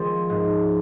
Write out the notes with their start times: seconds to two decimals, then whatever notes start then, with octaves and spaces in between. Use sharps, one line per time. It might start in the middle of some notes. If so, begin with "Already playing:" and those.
Already playing: F3 G#3 C4
0.30 G#2